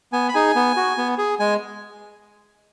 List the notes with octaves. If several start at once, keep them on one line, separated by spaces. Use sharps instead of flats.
B3 G#5
B5
D#4 G#4 G#5
B3
F#4
B3
G#4
G#3 G#5